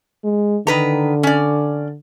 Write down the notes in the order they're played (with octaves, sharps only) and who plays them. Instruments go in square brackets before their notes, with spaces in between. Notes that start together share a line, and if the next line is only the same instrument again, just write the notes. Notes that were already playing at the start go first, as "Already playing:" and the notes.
[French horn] G#3
[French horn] D3 [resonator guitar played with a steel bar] D#3 B4 A#5
[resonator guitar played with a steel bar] C#4 D5